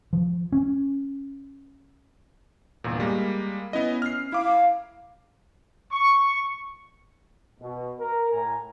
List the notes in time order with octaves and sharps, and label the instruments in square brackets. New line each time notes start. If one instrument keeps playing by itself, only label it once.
[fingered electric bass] F3
C#4
[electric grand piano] G1 E2 A#2
G3 G#3 A#3
[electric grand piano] B3 E4 D#5 [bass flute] C#4
[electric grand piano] F6 C7
[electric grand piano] E4 D6 [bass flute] F5
[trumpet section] C#6
[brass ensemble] B2
A#4
A2 G#5 A#5